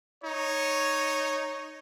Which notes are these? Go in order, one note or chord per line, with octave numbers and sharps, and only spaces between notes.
D#4 C#5